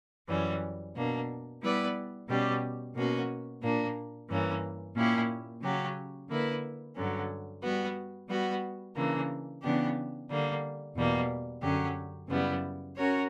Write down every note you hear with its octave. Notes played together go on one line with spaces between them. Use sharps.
F#2 E3 G3 C#4
B2 A#3 D4
G3 B3 E4 B4 D5
B2 G3 C#4 G4
B2 A#3 C#4 F#4
A#2 A#3 D4
G2 E3 A#3 C#4
A#2 A#3 C#4 E4 G4
C#3 F#3 C#4 G4
D3 A#3 E4 B4
G2 D3 F#3 C#4
G3 B3 F#4
G3 B3 F#4
C#3 E3 A#3 D4
C#3 E3 B3 D4 G4
D3 G3 A#3
E2 B2 G3 A#3
F#2 D3 F#3 C#4 G4
F#2 C#3 G3 B3 E4
C#4 F#4 A#4 C#5